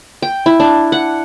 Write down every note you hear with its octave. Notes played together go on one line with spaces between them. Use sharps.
G5
E4
D4
F#5